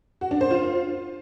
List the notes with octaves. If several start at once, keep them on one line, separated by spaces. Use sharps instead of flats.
F#4
D4
C5
F4